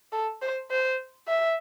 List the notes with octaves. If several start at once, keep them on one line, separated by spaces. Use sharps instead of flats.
A4
C5
C5
E5